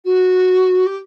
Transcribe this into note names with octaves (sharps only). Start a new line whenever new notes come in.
F#4
G4